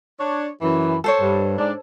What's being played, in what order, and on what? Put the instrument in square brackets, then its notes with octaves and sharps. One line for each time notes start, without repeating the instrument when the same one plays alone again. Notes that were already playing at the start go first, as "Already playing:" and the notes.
[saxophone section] D4 C#5
F#2 E3
[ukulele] A4 C5 C#5
[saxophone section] G2
G#2 D4